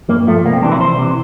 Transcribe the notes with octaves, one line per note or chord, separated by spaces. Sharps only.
G2 A#3
F3 A3
C2 A#3
C4
C3 E3 D4
E4
C2 C5
C3 E3